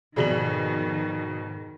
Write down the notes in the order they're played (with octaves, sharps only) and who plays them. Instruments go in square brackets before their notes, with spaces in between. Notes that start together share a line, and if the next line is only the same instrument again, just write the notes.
[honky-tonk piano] F2 B2 F#7 [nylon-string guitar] G#2 G#4 D5 [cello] D#3